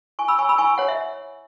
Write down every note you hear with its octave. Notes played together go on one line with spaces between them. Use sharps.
E4 G#5 C#6
B5 E6
C#5 G#5 C#6
B5 E6
E4 G#5 C#6
C#5 F#5
E5